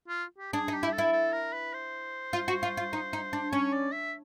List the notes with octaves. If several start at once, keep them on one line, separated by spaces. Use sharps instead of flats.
F4
G4
D4 G#4
D#4
G4
E4
A4
E4
A4
A#4
B4
C5
F4
F#4
F4
F4
D#4
D#4
D4
C#4 C#5
D5
E5